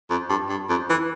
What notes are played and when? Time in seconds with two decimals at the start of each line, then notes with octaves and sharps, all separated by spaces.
0.10 F2
0.29 G2
0.49 G2
0.69 F2
0.90 E3